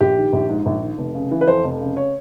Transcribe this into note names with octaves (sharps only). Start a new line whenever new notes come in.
A#1 G4
D#3
A#1
G#2
A#1
D#3
F1
C#3
E3
B4
F2 C5
F1
C#3
C#5